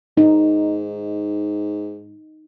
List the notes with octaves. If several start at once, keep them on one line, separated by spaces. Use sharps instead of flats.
G#2 D#4